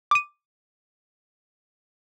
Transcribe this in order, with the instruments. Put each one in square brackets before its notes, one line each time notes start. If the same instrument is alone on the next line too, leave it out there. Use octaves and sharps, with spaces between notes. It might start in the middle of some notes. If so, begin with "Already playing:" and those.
[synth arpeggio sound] D6 D#7